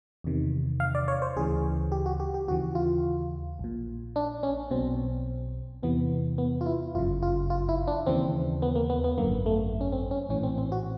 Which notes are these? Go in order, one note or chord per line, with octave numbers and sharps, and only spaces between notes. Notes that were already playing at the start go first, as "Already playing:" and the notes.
E2 C3 D#3
F5
D5
C#5
C5
D2 C#3 E3 G#4
G4
F#4
G4
G4
D#2 C#3 E3 F#4
F4
A#1 A#2
D4
C#4
B1 B2 C4
E2 C3 E3 B3
B3
F4
E4
G1 F#2 C#3 F4
F4
F4
E4
D4
D#2 C#3 E3 C4
B3
A#3
B3
B3
G#1 F#2 D3 A#3
A3
C#4
C4
C#4
A#1 A2 E3 C#4
C4
C4
F#4